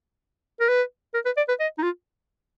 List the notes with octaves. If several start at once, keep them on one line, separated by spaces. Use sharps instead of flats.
A#4
B4
A#4
B4
D5
B4
D#5
D#4
F4